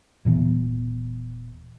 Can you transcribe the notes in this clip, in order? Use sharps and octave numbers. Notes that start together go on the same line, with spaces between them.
D#1 A#2 E3 B3